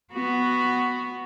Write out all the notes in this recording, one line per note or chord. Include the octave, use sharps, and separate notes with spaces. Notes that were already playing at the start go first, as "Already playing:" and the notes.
B3 F#4